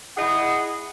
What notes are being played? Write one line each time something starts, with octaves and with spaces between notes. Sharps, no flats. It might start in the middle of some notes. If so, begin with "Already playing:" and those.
E4 G#4 D#5 F#5